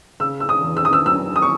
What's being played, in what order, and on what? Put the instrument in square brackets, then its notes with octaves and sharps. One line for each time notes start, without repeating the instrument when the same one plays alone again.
[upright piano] C#3 E6
E6
D#6
E2
E6
D#6
E6
F#3 E6
D#6
C#6